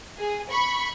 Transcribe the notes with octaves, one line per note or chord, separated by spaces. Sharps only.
G#4
B5 C#6